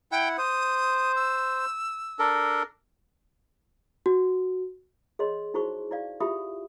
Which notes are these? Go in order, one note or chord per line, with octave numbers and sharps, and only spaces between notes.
E4 F#5 G5
C5 D#6
E6
D4 A4 A#4
F#4
G#4 C#5 D#5 C6
D#4 E4 F#4 G#4 C5 C#6
E4 D5 F5
E4 F4 G4 E5 B5 D#6